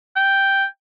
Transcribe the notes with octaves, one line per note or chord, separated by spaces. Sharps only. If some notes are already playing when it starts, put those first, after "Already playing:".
G5